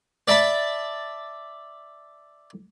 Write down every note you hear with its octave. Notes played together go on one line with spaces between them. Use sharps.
D5 E5 A5 B5